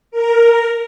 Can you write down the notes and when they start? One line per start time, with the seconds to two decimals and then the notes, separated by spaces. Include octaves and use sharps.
0.11 A#4